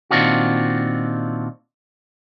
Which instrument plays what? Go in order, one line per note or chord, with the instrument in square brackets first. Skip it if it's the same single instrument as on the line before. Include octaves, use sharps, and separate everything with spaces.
[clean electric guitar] A#2 D#3 C4 D4 F4 F#4